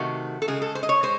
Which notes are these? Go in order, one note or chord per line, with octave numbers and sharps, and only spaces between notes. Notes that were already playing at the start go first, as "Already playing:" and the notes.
Already playing: C3 D#3 A3 F#4
A4
C#3 G#3 G#4
A4
C5
D#5
C#5
G#3 C5